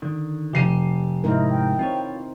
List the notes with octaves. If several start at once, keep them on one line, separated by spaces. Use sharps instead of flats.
D3 D#3
F1 G4 C7 D#7
G#2 C3 C4 D#4 E4 A#4
G5
C4 F4 B4 C#5